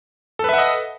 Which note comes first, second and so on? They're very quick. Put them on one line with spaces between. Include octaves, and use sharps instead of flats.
A4 B4 E5 F#5 D#5